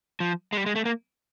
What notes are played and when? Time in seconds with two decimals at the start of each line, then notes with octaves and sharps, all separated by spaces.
0.20 F3
0.53 G#3
0.57 G3
0.66 G#3
0.76 A3
0.85 A#3